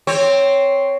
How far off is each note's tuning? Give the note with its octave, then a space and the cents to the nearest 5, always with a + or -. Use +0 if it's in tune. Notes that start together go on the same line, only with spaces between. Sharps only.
C4 +0 C#5 +0